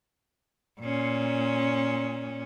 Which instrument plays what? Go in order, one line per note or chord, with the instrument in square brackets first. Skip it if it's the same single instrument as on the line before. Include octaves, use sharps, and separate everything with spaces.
[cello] A#2 C#4